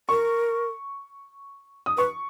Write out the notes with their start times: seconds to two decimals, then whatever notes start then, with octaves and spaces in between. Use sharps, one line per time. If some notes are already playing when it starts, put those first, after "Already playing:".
0.09 A#4 C#6
1.86 D#6
1.97 B4 C#6